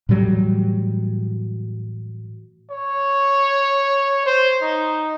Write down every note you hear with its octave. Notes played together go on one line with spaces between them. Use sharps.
A2 E3 F#3 G3
C#5
C5
D#4